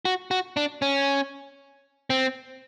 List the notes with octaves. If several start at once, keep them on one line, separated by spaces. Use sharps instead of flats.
F#4
F#4
D4
C#4
C4